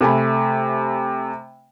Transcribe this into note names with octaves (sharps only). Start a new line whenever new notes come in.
C3 A3 G#5 B5